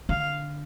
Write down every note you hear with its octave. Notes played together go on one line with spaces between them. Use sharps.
D3 F5